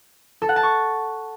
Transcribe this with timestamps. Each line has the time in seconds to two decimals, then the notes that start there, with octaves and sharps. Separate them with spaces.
0.42 A4
0.49 F#5
0.56 A5
0.63 C#6